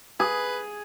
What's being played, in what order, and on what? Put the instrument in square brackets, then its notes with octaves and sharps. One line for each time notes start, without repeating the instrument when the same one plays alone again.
[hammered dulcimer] G#4 [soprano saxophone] B4